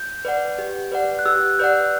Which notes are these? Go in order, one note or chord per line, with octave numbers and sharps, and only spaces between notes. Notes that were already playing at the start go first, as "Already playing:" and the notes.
Already playing: G6
B4 D5 F#5
G4
B4 D5 F#5
F#6
G4 E6
B4 D5 F#5 G6